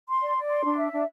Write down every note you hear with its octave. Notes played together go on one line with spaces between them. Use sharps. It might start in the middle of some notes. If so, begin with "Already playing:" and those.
C6
D5
D5
C6
D4
E5
D4